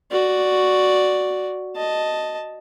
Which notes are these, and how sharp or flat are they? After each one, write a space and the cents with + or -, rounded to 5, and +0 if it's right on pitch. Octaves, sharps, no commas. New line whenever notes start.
F#4 +0 D5 +0
D#5 +0 A5 +0